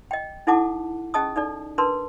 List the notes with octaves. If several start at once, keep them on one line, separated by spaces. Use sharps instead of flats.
D#5 G5
D#4 E4 A4 F#5 A5 D6
C#4 G#4 D#5 A5 D#6
D#4 A4 D5
D4 A#4 B4 A5 C6